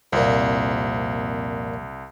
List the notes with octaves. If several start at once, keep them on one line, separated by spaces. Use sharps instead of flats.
C2 F2 A#2